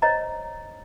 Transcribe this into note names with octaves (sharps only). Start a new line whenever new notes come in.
C5 C#5 D#5 A#5